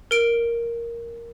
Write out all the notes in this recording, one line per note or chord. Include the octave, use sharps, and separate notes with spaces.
A#4 D7